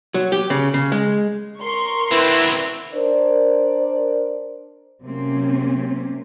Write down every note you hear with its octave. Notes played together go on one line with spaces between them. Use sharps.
F#3
G4
C#3
C#3
G#3
A#4 C6 C#6
D3 C4 E4 B4
D4 A#4 C5 D5
C3 F#3 A#3 C4 C#4